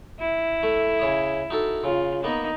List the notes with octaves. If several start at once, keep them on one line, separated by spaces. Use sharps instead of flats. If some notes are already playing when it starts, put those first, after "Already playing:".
E4
A3
C#3 C#5 D#6
D#4 F#4 A4
C#3 F4
A#3 B3 D#4